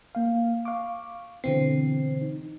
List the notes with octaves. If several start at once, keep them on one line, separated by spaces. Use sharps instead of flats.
A#3 F5
F5 C#6 D6
B2 D3 E3 C4 C7
D#4